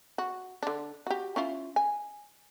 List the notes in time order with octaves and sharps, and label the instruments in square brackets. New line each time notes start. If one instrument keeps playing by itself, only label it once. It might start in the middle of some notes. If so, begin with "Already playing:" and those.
[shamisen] F#4
D3 D4
F#4 G4
C#4 E4 F4
G#5